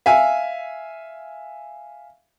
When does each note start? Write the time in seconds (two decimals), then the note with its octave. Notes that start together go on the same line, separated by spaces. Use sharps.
0.06 E5 F5 G#5